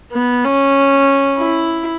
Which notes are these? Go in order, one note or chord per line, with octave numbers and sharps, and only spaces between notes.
B3
C#4
E4